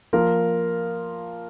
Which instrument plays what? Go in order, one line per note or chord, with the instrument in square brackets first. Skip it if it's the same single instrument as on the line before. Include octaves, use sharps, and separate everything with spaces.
[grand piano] F3 A#3 F4 A#4